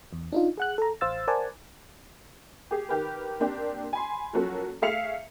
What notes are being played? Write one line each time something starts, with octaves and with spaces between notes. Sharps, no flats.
E2
D4 D#4 F4
G#4 F#5 F#6
A4 A#5
A1 C5 F5 E6 A6
A#4 C5 D5 F#5 G#5 A5
G4 G#4
D#3 G4 A#4 B4
A#3 C4 D4 G4
G#5 B5 C6
F3 F#3 A#3 C#4 F#4 A4
A3 G#4 E5 F5 C#7 F7